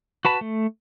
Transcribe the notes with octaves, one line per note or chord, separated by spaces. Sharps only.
F#4 B4 A5 B5
A3